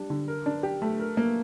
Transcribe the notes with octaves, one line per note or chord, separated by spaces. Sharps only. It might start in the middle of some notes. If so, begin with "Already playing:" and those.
Already playing: G3 D4
D3
A#4
D4
G4
A3
A#4
A#3